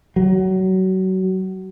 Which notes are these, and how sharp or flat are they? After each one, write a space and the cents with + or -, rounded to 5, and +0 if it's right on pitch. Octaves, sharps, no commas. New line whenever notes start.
F#3 +25